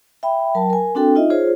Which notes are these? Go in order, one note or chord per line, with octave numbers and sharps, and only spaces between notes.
E5 G5 B5
F#3 A#4 G5 A5
A#4 G#5
C4 D4 F#4 A4 G5
D#4 F4 D#5 E5
F4 G#4 C5 C#5